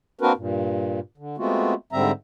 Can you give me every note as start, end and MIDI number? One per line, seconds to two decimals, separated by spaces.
0.21 0.33 58
0.21 0.33 60
0.21 0.33 62
0.21 0.33 66
0.21 0.33 70
0.21 0.33 71
0.37 1.00 43
0.37 1.00 46
1.17 1.36 50
1.38 1.74 56
1.38 1.74 57
1.38 1.74 59
1.38 1.74 60
1.38 1.74 65
1.38 1.74 66
1.92 2.11 44
1.92 2.11 50
1.92 2.11 55
1.92 2.11 60
1.92 2.11 76
1.92 2.11 82